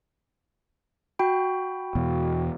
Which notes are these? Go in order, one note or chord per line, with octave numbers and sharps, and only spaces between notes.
F#4 G5 B5
E2 B2